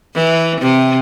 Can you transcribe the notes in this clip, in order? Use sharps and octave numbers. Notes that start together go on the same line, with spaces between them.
E3
C3